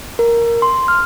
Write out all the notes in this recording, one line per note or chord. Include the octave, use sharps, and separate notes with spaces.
A#4
C6
F6